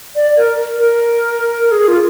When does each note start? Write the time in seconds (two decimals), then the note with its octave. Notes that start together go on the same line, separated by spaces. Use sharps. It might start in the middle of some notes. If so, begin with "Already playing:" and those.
0.16 D5
0.37 A#4
0.78 A#4
1.71 G#4
1.88 F4